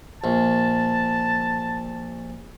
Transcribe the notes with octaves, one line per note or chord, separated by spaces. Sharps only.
A#1 A5